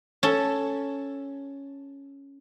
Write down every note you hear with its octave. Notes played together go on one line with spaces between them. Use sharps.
C#4 A4